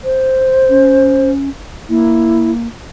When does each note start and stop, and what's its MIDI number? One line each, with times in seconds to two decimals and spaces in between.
0.04 1.31 72
0.70 1.49 61
1.89 2.67 58
1.89 2.51 64